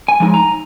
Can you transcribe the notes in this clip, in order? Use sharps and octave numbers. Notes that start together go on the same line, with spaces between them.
G#5
F3 G#3 D#4
A#5